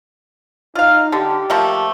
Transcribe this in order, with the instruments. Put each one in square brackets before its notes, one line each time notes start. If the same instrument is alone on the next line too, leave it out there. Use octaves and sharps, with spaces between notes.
[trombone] D#4 [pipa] F4 F5
[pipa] D3 [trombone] G4
[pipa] F3 A3 A#3